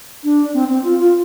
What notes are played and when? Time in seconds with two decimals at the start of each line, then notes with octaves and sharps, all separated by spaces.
0.24 D4
0.54 C4
0.69 C4
0.84 F4
0.99 F4